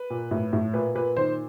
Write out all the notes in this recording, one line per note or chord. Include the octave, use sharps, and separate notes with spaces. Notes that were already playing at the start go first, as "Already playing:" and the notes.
Already playing: B4
A#2
A2
A2
A#2 B4
A#2 B4
D#3 C5